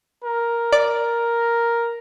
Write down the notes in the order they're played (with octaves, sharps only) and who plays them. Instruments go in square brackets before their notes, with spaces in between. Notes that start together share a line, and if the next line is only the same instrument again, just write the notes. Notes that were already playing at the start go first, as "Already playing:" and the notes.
[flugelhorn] A#4
[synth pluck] D5